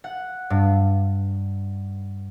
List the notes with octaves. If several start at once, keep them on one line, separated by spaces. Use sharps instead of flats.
F#5
G2